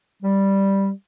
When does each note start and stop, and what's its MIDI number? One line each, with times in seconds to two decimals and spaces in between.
0.23 0.90 55